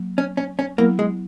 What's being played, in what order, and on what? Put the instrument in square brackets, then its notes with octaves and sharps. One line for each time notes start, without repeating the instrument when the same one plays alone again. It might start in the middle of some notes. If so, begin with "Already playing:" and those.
Already playing: [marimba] F#3 A#3
[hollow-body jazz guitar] C#4
C#4
C#4
[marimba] F#3 B3 E4 [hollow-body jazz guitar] A#3
[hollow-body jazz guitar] G#3